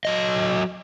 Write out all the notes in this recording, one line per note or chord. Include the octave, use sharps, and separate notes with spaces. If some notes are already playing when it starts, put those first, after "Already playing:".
F#3 D#5